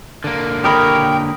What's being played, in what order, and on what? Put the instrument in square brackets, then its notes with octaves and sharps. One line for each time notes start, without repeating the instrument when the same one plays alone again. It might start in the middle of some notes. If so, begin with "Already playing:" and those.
[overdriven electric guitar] D3 A#3
[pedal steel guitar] G4 A#4 C#5 [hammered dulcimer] D#5 B5 [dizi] G5